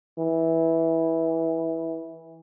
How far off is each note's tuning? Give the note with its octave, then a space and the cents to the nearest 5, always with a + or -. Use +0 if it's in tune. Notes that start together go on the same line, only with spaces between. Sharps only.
E3 -15